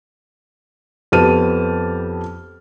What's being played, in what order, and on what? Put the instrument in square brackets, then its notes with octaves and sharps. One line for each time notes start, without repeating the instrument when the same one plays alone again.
[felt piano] F2 B3 G4 A5 F6 D#7